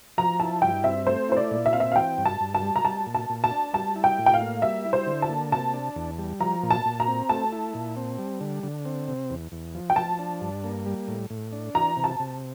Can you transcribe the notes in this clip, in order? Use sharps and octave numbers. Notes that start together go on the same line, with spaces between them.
F3 A#5
E4 A5
G2 G5
C4 E5
A3 C5
E4 C5
D5
A#2
E5
C4 F5
E5
F5
E3 G5
G2
A5
G2
A5
G3
A#5
G3 A5
A#2
A5
A#2
A5
D4
G3 A5
E4
G5
A2
G5
F5
A#3
G3 E5
E4
C5
D3
A5
A#3
C3 A5
D4
E2
G3
F3 A#5
A#2
A5
A#2
A#5
C4
A3 A5
E4
A#2
C4
G3
D3
D3
C4
C3
E2
E2
F3
G5
F3 A5
D4
G2
A#3
G3
A2
A2
D4
E3 A#5
C3
A5
C3